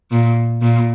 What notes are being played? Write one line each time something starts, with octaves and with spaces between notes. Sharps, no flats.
A#2
A#2